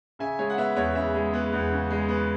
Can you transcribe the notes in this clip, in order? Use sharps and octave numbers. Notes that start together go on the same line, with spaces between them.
C#3 E5 G#5
G#3 C#5
F#5
B3 E5
E2 C#5
C#3 E5
G#3
B3
E2
C#3
G#3
B3